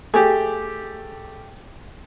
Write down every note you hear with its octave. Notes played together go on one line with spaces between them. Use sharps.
A3 G4 G#4